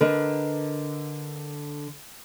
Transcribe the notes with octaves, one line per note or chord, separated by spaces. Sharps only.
D3 A#4 B4 D#5